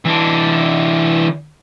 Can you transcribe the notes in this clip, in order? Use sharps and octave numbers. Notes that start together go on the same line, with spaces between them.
E3 D4